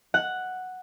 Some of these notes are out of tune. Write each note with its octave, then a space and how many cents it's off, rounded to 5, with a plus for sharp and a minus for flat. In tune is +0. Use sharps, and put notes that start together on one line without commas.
F#5 +0